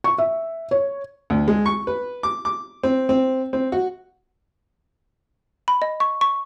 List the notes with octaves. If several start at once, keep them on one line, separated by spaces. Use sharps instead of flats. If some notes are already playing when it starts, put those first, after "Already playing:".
C#6
E5
C#5
D2
G#3
C#6
B4
D6
D6
C4
C4
C4
F#4
B5
D#5
C#6
C#6